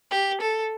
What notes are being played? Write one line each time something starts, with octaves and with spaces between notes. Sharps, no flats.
G4
A4